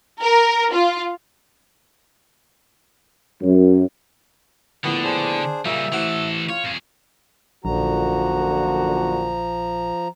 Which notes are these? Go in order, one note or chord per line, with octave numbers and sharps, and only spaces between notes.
A#4
F4
F#2
A#1 A2 D3 B3
D4 G#4 C5
A#2 C#3 G3 D#4 E5
A1 E3 A4 C5 F#5
F4 C#5 C#6
F2 G#4
A#1 F#2 A#2 D3 F3 F#4 A#5